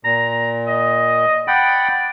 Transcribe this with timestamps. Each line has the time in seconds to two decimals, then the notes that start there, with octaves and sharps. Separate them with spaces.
0.04 A#2 A#5
0.67 D#5
1.48 D5 F#5 G5 B5